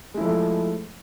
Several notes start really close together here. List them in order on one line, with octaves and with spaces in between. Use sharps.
G#3 E4 F3 A3